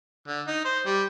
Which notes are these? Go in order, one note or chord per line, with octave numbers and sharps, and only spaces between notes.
D3
D#4
C5
G3